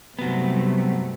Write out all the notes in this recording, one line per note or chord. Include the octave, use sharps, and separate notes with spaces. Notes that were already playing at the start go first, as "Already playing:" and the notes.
G2 C3 F#3 A3 B3